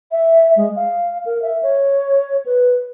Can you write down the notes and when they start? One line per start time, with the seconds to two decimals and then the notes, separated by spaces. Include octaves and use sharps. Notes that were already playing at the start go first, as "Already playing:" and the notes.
0.12 E5
0.56 G#3
0.76 F5
1.26 A#4
1.42 E5
1.63 C#5
2.46 B4